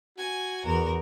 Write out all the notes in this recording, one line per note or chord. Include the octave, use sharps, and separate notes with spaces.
F#4 G#5
E2 A#4